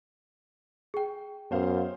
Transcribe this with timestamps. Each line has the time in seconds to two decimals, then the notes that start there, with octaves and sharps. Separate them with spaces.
0.94 G#4 G5
1.51 F#2 B3 C5 F5